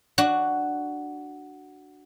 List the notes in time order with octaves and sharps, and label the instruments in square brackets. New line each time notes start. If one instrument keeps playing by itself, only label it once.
[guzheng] D4 F#4